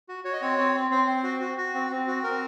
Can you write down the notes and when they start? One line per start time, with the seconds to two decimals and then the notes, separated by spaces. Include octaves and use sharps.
0.09 F#4
0.24 F#4 C#5
0.33 D#5
0.41 C4 C#5
0.58 C4
0.75 C4
0.91 C4 C5
1.08 C4
1.24 F#4
1.41 F#4
1.57 F#4
1.74 C4
1.90 C4
2.07 F#4
2.23 C4 A#4